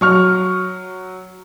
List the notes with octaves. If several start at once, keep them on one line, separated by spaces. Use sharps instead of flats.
F#3 C#6 F6